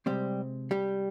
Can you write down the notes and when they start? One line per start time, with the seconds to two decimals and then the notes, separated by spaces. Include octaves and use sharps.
0.06 C3 F3 G3 G#3 C4 G4
0.71 G3 G4